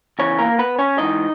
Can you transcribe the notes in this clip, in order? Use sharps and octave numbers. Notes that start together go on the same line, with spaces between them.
E2 C#3 E3 C#4 C#5
A#3 A#4
B3 B4
C#4 C#5
G#2 E3 D#4 D#5